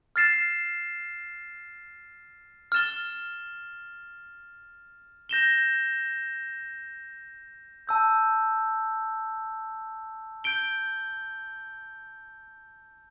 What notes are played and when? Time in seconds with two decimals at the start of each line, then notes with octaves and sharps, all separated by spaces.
0.16 F6 A6 C7 E7
2.72 F6 A6 E7 G7
5.29 G6 A#6 E7 G7
7.87 A5 E6 G6
10.44 G6 D7 G7